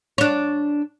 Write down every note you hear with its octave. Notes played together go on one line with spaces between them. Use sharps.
D4 C#5